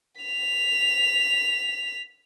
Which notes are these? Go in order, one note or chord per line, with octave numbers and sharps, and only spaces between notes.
B6 F7